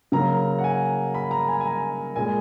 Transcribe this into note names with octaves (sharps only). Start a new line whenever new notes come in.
C#3 F#3 A#3 A#5
F#5
G#5
B5
A#5
G#5
G#5
A#5
A#2 G#3 G#5